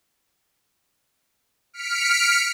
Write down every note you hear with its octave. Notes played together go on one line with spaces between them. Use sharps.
F6 B6 C#7 D7